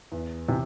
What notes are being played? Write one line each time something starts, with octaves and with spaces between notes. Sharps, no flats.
E2
C3 E3